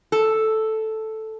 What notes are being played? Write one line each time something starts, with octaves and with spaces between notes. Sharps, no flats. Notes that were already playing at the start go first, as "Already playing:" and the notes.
A4